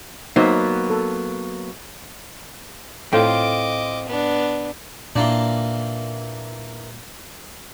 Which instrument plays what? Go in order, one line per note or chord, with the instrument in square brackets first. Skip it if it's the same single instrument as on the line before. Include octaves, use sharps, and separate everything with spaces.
[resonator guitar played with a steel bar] F#3 A#3 B3 [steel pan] D#4 C5 E5
[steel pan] A4
[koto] A2 [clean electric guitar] C4 F4 [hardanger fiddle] D#5 D6
[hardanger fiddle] B3 D4
[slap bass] A#2 [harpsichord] E3 A#3 D4